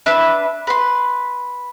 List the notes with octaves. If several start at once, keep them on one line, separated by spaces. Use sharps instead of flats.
D4 B4 E5 E6
B4 C6